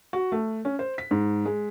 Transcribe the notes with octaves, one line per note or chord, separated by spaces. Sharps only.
F#4
A3
C#4
C5
B6
G#2
G#3